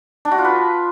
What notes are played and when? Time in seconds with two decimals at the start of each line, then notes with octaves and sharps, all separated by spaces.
0.25 D4
0.31 F#4
0.38 F4
0.45 B4